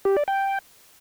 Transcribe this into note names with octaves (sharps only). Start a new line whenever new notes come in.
G4
D5
G5